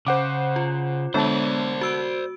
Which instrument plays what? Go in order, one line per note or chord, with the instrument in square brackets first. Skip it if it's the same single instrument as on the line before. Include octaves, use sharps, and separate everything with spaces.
[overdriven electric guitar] C#3 [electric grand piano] C5 F#5 D6
[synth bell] F4
[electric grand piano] D3 A5 [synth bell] G#3 B3 [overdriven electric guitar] C5 D5
[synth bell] F#4 E6 D7